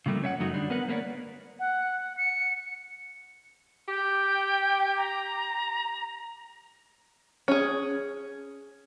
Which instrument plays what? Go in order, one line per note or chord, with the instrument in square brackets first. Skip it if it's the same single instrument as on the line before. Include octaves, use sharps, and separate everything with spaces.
[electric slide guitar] C#3 F3 G3 A3 A#3
C#4 C#5 E5 F#5
F#2 F#3 A3 D#4 F#4
D3 G3 D4
B3 A#4 B4 F#5
A#3 A#4 B4 C#5 D5
[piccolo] F#5
C#7
[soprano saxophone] G4 [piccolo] G5
[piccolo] A#5
[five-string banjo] C#4 G#4